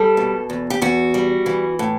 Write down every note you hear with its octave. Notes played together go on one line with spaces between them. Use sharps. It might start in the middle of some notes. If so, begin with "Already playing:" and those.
Already playing: G3 A4
B2
E2
G4
E2 F#4
G3
E3
A2